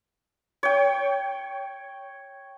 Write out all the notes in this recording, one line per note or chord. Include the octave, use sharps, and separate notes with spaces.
C#5 G5